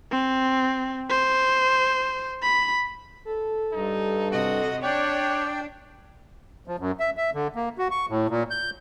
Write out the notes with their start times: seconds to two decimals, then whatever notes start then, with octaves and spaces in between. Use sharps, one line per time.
0.11 C4
1.10 C5
2.42 B5
3.25 A4
3.73 G2 D#4
4.31 C3 F#4 D#5
4.83 D4 C#5 D5 G5 F#6
6.68 F3
6.79 F#2
7.00 E5
7.17 E5
7.34 D3
7.56 A#3
7.78 F#4
7.91 C#6
8.09 A2
8.29 A#2
8.51 G6